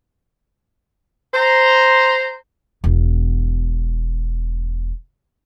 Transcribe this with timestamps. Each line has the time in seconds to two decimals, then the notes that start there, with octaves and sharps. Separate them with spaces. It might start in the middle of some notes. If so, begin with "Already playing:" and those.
1.34 C5 A#5
2.84 E1 B3